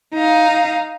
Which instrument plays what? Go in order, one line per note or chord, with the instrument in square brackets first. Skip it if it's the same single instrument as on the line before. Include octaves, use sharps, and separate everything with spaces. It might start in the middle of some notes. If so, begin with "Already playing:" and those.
[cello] D#4 F5